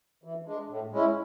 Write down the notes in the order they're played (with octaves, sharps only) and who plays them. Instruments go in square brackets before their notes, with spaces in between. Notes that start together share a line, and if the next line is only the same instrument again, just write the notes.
[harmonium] E3
G#3 D4
A2
G#3 C#4 E4